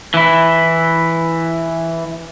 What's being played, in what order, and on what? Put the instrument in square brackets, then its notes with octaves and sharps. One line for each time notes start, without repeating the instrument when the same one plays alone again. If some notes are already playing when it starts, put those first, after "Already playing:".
[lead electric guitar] E3 E4